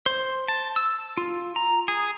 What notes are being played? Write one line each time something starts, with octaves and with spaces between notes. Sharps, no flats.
C5
A5
E6
F4
A#5
G#4